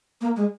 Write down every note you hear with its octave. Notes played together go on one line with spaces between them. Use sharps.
A#3
G#3